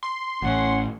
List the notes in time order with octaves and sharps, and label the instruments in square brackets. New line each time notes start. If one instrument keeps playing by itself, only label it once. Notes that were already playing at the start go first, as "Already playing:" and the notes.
[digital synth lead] C6
[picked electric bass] A1 [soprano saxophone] C#4 [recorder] F#5